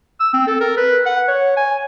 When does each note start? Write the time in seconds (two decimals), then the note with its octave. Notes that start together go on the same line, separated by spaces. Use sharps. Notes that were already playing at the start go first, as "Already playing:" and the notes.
0.20 E6
0.34 C4
0.47 A4
0.61 A#4
0.77 B4
1.06 F#5
1.28 C#5
1.57 G#5